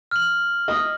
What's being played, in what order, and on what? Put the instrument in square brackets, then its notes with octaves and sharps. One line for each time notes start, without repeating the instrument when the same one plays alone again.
[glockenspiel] F6 F#7
[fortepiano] D#5